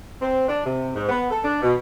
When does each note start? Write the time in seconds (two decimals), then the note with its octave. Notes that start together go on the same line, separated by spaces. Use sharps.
0.22 C4
0.48 D4
0.64 C3
0.94 G#2
1.09 B3
1.31 A4
1.44 D4
1.62 B2